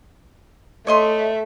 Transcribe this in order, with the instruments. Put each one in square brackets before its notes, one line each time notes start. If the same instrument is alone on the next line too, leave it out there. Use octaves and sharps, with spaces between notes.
[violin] A3 E5 [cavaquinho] C#5 D#5 C6